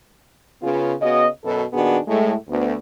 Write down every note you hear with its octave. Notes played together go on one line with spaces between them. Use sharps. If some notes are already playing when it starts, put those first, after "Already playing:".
C#3 B3 F4
C#3 B3 F#4 D#5
F#2 B2 A4 B4
A#2 D#3 B3 D4 F#4 G#4
A2 G#3 A3
D2 B3